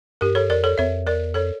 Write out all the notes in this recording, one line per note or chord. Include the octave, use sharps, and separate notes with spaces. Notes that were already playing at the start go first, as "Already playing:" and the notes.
G2 G4 A#4
A4 C#5
F2 A#4 D5
A4 C#5
F2 C#5 E5
E2 A#4 D5
F2 A4 C#5